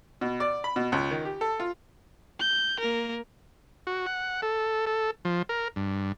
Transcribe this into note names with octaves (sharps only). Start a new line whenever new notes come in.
B2
D5
B5
B2
C#2
D#3
G4
A4
F4
G6
A#3 A#4
F#4
F#5
A4
A4
F3
A#4
G2